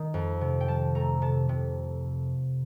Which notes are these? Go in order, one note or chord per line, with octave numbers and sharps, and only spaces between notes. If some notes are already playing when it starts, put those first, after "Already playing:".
Already playing: D#3
F2
C3
G5
F3 A5
A3 A#5
C3 A5
C3